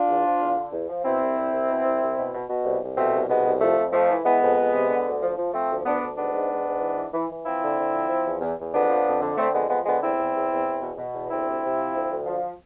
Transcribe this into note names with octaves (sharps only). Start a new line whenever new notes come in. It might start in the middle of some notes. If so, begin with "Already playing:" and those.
Already playing: D4 F4
E2
F3
E2
D3
E2
F3
B2 C4 E4
C2
C2
C2
B2
C2
C2
B2
B2
B2
C2
C2
B2 A3 C4
C2
B2 G#3 B3
C2
F2 F3 A3
F2
F2 F3 A3
E3
E3 G#3 B3
F2
F2
C3
D3
D2
F3
F3
F3 A3 C4
D2
D2 B3 D4
D2
G#2 B3 D4
G#2
G#2
G#2
E3
E3
E3
E3
F3 C4 E4
D3
D3
F3
F3
E2
E2
E2
F2 B3 D4
F3
F2
D3
D3 A3 C4
F2 G#3 B3
F3 G#3 B3
D3 G#3 B3
E2 C4 E4
E2
E2
E2
E2
B2
B2
E2
D2 C4 E4
C3
C3
F3
D2
D2
F3